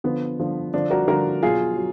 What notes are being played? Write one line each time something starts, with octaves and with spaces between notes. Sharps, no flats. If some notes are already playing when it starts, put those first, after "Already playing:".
D3 F3 B3
D3 F3
D3 F3 D4
F#4 A#4
D3 F3 F#4 A#4
B2 F#3 F4 G#4
F#3